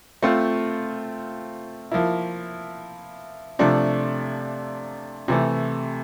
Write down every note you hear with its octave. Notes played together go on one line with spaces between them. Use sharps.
A3 C4 F4
F3 A#3 E4
C3 F3 A3 D4
C3 E3 A3